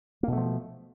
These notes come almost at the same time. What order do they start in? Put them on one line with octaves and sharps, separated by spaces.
A#3 B2 A3 F3